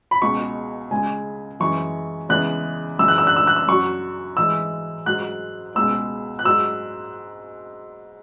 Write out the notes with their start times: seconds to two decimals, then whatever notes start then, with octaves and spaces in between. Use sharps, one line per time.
0.11 B5
0.22 C#2 B2 G#3 C#6
0.90 C#2 C#3 G#3 G#5
1.60 F#2 E3 G#3 C#6
2.29 E2 C#3 E3 G#3 F#6
2.99 F#2 C#3 E3 G#3 E6
3.08 F#6
3.18 E6
3.27 F#6
3.36 E6
3.47 F#6
3.56 E6
3.67 F#2 F#3 C#6
4.37 G#2 E3 G#3 E6
5.06 G#2 F#3 F#6
5.75 C#2 B2 G#3 E6
6.39 F#6
6.45 G#2 F#3 E6